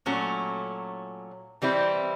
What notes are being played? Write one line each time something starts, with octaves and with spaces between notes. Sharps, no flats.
A#2 F#3 A3 C#4
E3 G3 C4 E4